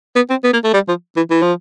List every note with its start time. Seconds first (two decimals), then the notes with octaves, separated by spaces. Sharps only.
0.16 B3
0.30 C4
0.44 B3
0.53 A#3
0.64 A3
0.74 G3
0.88 F3
1.17 E3
1.31 E3
1.42 F3